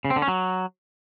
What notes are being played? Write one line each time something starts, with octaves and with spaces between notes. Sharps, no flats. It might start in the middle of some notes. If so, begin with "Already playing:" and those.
C#3
C4
D3
C#4
F#3